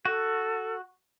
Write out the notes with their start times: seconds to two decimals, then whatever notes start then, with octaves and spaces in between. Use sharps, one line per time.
0.05 F#4 A4